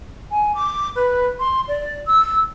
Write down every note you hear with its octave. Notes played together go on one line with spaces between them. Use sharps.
G#5
D6
B4
C6
D5
E6